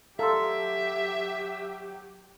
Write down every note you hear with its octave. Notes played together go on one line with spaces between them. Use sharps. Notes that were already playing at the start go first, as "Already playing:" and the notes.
F#3 G4 A4 E5 F5 A#5 C6